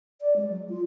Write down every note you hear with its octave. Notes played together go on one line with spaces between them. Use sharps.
D5
G#3
F#3
F4